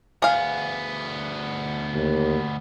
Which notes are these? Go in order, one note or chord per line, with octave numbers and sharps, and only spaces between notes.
D2 B3 G#4 F5
D#2